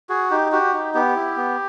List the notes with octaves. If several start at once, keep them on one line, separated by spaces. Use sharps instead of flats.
F#4 G#4
D#4 G4
F#4 G4
D#4
B3 G4
E4
B3